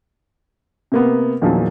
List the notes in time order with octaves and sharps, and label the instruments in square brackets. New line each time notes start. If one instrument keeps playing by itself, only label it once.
[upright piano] C3 A#3 B3
E2 A#2 D#3 F3 F#3